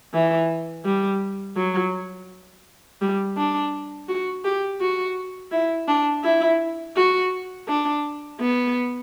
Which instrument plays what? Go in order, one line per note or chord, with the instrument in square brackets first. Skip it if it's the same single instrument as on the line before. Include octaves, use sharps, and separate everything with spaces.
[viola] E3
G3
F#3
G3
D4
F#4
G4
F#4
E4
D4
E4
F#4
D4
B3